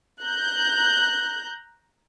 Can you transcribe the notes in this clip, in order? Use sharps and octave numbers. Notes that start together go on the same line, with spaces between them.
A#5 F#6 G6